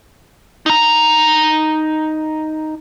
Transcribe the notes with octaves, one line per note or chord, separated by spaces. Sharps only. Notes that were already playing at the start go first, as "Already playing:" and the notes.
D#4 A#5